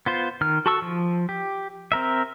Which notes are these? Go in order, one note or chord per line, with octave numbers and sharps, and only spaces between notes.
B3 F4 C5
D#3 F6
F#4 A4 A5 C#6 E6
F3
G4
C4 A#4 E5